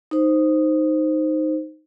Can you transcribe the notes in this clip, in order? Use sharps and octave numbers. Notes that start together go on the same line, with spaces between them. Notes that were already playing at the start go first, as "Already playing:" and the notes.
D#4 C5